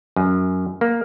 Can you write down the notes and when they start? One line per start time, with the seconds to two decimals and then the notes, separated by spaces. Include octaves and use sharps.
0.16 F#2
0.81 A#3